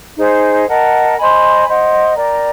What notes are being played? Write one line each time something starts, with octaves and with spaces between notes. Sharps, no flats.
D#4 G#4 C5
A#4 D#5 F#5 A5
C5 D#5 G#5 B5
C5 D#5 F#5
A#4 D5 G5 A#5